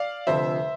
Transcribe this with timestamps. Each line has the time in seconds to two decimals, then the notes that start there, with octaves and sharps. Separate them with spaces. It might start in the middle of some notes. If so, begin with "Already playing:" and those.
Already playing: D5 F5
0.27 F1 F2 D3 F3 C5 E5